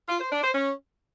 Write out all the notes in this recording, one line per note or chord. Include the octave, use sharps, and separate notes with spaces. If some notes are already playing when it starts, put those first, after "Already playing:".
F4
C5
D4
C5
C#4